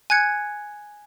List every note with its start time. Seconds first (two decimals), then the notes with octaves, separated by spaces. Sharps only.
0.10 G#5 F#6 G#6 C#7